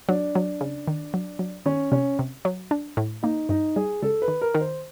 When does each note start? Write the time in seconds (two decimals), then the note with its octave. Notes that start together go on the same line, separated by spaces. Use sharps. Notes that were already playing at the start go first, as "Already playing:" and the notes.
0.09 F#3 D4
0.35 F#3
0.61 C#3
0.88 D#3
1.14 F#3
1.39 F#3
1.66 D#3 C#4
1.92 C3 C#4
2.19 C3
2.45 F#3
2.71 D4
2.97 A2
3.23 A#3 D#4
3.49 G2 D#4
3.76 G3 G#4
4.02 C#2 A4
4.22 B4
4.28 D#3
4.41 A#4
4.54 D#3
4.61 C5